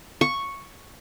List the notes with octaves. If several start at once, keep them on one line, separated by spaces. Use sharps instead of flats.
C#6